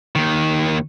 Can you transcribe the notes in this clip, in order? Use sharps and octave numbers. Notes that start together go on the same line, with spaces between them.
D#2 D#3